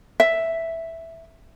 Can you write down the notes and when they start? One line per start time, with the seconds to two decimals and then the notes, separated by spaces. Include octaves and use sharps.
0.20 E5